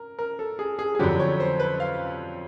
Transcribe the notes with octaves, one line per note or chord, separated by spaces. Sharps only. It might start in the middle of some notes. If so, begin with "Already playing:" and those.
Already playing: A#4
A#4
A4
G#4
G#4
G#4
F2 D3 F#3 G4
C#5
C5
B4
F5